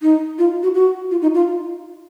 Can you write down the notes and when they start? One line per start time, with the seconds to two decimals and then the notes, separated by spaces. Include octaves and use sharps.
0.02 D#4
0.38 F4
0.63 F#4
0.74 F#4
1.11 F4
1.22 D#4
1.34 F4